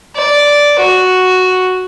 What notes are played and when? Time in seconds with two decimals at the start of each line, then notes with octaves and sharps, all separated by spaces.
0.16 D5
0.80 F#4